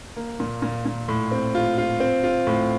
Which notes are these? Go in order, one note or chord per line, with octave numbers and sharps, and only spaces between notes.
A#3
A#2
A#2
A#2
A2
C4
F4
F4
C4
F4
A2